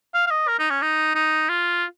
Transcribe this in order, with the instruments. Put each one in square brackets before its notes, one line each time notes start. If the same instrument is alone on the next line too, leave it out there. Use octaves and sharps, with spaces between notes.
[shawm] F5
F5
D#5
A#4
D#4
C#4
D#4
D#4
F4